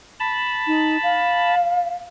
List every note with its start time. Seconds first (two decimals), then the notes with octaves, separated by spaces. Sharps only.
0.20 A5 B5
0.67 D#4
1.03 F5